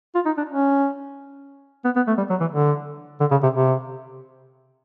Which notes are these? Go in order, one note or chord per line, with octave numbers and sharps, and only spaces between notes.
F4
D#4
D4
C#4
B3
B3
A3
G3
F#3
E3
D3
D3
C#3
C3
C3